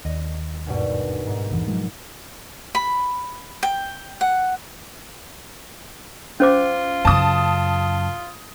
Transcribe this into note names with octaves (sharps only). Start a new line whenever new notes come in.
D#2 D#5
G#1 G2 B2
G#2
A#1 F2 E3
F3 F#3 G#3
B5
G5
F#5
C#4 F4 C5 D6
F#2 C#3 A5 D#6